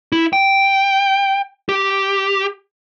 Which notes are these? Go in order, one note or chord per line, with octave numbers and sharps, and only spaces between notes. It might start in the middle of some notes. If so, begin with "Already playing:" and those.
E4
G5
G4